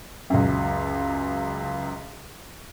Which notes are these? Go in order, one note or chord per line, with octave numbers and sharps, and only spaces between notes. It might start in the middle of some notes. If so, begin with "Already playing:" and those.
C#2 F#2